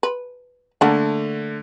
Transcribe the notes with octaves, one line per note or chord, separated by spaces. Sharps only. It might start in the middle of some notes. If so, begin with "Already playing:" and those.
B4
D3 A3 A#3 D4 F#5